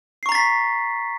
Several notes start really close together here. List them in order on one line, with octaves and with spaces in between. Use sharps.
C7 C#6 A#5 A6 B6